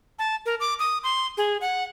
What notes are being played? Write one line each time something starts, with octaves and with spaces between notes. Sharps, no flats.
A5
A#4
D6
D#6
C6
G#4
F#5